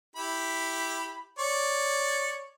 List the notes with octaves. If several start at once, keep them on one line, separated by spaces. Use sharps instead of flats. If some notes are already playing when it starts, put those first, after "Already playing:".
E4 G4 B5
C#5 D5